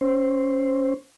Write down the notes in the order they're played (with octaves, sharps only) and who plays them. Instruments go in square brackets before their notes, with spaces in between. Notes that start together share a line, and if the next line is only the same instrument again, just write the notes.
[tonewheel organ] C#4 C5